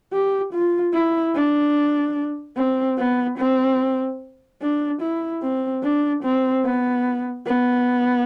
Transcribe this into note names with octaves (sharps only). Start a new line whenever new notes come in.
G4
F4
E4
D4
C4
B3
C4
D4
E4
C4
D4
C4
B3
B3